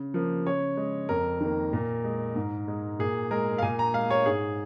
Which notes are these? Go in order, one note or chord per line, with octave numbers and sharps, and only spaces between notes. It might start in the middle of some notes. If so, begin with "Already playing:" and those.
Already playing: C#3
F3 A#3
C#3 C#5
G#3
F2 A#4
D#3 A#3
A#2
G#3
G#2
G#3
A#2 G#4
G#3 A#4
F5
A#2 G#5
A#5
G#3 F5
C#5
G#2 G#4